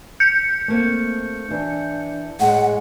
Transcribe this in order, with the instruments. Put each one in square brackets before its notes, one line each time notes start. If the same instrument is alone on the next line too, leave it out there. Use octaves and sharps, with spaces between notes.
[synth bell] G6 C#7
[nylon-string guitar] A3 A#3 C4
[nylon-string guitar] E3 B4 [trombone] D4
[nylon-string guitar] A2 [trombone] G#3 [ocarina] F#5